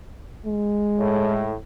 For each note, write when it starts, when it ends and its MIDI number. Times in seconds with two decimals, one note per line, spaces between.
0.46 1.48 56
0.98 1.53 45